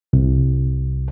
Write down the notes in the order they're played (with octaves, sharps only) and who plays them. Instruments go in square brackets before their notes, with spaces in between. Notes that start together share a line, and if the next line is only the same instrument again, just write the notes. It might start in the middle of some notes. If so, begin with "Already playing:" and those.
[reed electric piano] C2